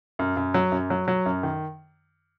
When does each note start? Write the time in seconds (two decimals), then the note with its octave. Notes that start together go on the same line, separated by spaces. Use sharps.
0.19 F#2
0.37 F#2
0.54 F#3
0.72 F#2
0.90 F#3
1.08 F#3
1.26 F#2
1.43 D#3